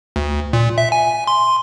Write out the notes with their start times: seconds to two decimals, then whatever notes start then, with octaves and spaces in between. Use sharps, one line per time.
0.16 D2
0.53 A#2
0.78 E5
0.92 G#5
1.27 C6